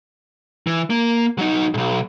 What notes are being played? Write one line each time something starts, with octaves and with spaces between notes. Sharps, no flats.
E3
A#3
F#3 D#4
B1 G#2